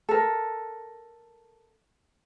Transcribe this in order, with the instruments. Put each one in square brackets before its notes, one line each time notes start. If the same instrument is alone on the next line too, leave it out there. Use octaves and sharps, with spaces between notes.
[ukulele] A4 A#4